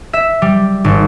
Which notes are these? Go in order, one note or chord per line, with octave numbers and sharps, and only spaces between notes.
E5
G3
G#1